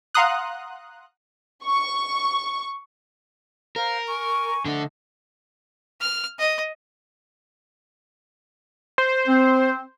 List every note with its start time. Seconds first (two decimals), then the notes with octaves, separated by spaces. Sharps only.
0.15 F5 F#5 A#5 C6 D#6 F#6
1.65 C#6
3.76 A#4 C5 F5
4.07 G#5 C#6
4.65 D3 F3 A3 D4 D#5
6.00 F6
6.39 D#5
8.98 C5
9.28 C4